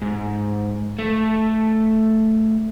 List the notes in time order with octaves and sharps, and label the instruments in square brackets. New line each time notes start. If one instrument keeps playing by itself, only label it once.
[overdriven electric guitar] G#2
A3